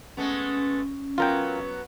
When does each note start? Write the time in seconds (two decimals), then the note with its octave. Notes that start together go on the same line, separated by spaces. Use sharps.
0.17 G#3 A3 B3 C#4
1.18 F#3 B3 F4 A#4 G5